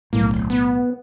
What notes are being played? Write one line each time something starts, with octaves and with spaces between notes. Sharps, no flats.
B1 A2 A#3
D1
B3